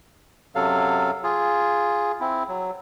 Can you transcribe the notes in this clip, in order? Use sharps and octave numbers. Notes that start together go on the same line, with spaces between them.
F#2 C3 F#3 A4 F5
F4 G#4
C4 E4
F#3